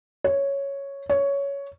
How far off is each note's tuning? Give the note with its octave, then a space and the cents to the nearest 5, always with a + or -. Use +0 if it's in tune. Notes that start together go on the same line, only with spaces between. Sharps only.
C#5 +0
C#5 +10